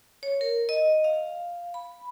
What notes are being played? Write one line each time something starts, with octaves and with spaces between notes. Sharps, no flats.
C#5
A#4
D#5
F5
B5